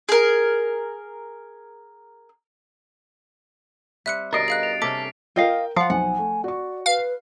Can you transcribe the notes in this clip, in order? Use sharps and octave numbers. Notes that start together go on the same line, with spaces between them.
G#4 A#4
G3 C4 E5 F#6 C#7
G2 B2 C#4 A#4 D#5 A6 C7 D7
G#4 F5 F#6
F7
C3 A#3 C#4 A4 D6 B6
F4 A#4 D#5 F5 G5
F3 F5 F#5
B1 F#5 G#5
A3
F#4 D5 C#6
B4 F5